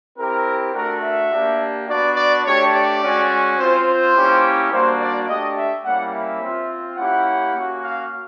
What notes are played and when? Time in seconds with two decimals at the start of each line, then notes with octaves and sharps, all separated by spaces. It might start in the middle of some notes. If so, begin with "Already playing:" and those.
0.18 C4 E4 G4 A#4
0.75 A3 D4 F#4 A#4
1.03 E5
1.32 A#3 D4 G4
1.88 B3 D4 F#4 D5
2.16 D5
2.45 A3 D4 G4 C#5
2.74 D5
3.02 G#3 C#4 F#4
3.58 C4 F4 C5
3.87 C5
4.15 A#3 C#4 E4 G4
4.72 G3 A#3 D4 F#4 C5
5.01 D5
5.28 A3 D4 G4 D#5
5.57 E5
5.85 G3 A#3 C#4 E4 G4 F#5
6.14 E5
6.41 C4 F4
6.98 A#3 C#4 E4 G4 F#5
7.55 A#3 C#4 F#4
7.83 F5